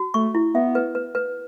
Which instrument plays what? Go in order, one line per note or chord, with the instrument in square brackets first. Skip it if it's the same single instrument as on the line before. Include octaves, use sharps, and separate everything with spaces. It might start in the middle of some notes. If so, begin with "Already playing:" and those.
Already playing: [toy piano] F#4
[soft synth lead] A3 [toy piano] C#6
[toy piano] E4
[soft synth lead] B3 [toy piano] E5
[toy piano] B4
B4
B4